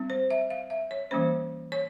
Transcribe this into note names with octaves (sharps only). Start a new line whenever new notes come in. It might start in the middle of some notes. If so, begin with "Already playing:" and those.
Already playing: G3 C4
C5
E5
F5
E5
C#5
E3 G3 A#3 C#4 C5
C#5